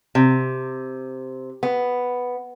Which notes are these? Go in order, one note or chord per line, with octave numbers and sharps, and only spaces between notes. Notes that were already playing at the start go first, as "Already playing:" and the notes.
C3
B3